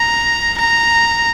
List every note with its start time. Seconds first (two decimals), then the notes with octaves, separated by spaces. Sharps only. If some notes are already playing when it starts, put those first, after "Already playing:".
Already playing: A#5
0.58 A#5